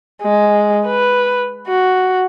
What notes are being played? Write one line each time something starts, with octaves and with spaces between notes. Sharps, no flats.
G#3
B4
F#4